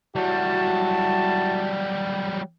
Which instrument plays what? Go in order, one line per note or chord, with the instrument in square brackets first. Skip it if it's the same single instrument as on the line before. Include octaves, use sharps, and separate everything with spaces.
[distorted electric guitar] F#3 G3 [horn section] E4 F#4 A5